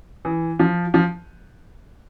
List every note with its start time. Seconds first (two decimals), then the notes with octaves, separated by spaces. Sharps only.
0.25 E3
0.59 F3
0.94 F3